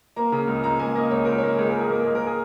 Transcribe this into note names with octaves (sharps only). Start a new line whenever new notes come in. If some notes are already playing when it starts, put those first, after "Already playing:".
A#3 A#5
C#3
C#2
C#2 A#5
A#3 G#5
A#3 D#5
C#2 C#5
C#2 A#4
A#3 C#5
C#2 G#4
C#2 A#4
G#4
A#3 A#4
G#3 G#4
A#4
G#4